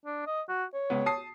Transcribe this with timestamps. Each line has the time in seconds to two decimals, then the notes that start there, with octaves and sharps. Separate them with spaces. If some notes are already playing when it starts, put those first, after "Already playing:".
0.06 D4
0.27 D#5
0.49 F#4
0.74 C#5
0.90 C#2 B3
1.06 A5 D#6 C7